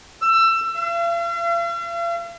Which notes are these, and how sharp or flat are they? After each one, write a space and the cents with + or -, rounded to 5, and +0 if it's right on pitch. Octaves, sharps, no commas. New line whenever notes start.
E6 +25
F5 -45